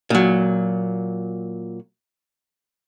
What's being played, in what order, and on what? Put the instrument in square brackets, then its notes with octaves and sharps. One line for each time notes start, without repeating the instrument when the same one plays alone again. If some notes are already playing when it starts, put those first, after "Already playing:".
[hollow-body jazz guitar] A#2 F#3